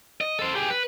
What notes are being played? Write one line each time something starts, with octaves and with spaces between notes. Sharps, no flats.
D#5
A4 C5
G4 G#4
B4